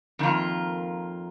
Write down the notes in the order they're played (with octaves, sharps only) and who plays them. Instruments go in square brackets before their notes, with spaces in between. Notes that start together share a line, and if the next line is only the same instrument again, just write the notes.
[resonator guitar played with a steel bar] F2 D#3 A#3 F4